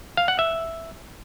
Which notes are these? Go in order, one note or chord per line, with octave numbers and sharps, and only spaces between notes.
F5
F#5
E5